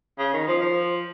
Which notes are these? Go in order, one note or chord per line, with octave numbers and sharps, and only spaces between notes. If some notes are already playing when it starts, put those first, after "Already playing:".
C#3
D#3
F3
F3